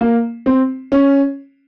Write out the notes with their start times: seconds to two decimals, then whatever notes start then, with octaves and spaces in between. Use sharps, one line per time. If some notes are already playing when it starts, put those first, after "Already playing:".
0.01 A#3
0.46 C4
0.92 C#4